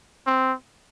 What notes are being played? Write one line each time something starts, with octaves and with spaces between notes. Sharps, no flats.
C4